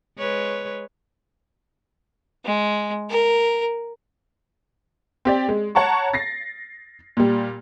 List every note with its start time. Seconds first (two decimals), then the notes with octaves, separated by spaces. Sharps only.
0.18 G#3 B4 C#5
2.45 G#3
3.10 A#4
5.25 C4 G4 D5
5.49 G#3
5.75 C#5 F#5 A5 A#5 C#6
6.13 A6 A#6 C7
7.17 A#2 G3